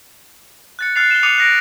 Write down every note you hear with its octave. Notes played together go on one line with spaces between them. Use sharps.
F#6 A6 C#7
F6 F#6 A6 C7 F7
E7 G7
D6 D#6 F#6 C#7 D#7 F7
F#6 A#6 D7